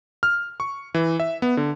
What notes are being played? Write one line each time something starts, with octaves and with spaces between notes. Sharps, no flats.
F6
C#6
E3
E5
B3
D3